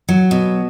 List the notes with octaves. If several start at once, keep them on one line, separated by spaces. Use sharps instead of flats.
F#3
B2